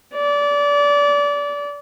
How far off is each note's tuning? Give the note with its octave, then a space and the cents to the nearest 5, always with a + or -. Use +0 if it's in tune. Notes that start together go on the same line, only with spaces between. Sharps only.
D5 -25